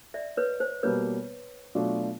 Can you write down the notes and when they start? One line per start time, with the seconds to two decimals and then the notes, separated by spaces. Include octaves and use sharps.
0.14 D5 E5
0.37 B4 C#5
0.60 C5
0.83 B2 G3 A#3 B4 C#5
1.75 B2 F#3 A3 D4 F4